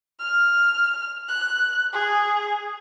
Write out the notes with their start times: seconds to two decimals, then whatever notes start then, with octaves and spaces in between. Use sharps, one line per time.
0.20 F6
1.29 F#6
1.93 G#4